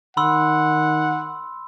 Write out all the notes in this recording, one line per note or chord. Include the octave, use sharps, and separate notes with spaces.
D#3 F#5 B5 C6 E6